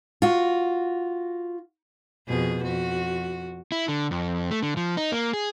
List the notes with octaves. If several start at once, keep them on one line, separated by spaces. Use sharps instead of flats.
F4 F#4
F2 B2 G#4
F2 F#4
E4
D3
F2
A3
D3
F3
D#4
A#3
G#4